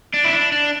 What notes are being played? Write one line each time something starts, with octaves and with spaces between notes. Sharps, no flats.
D4
E4
D4
D4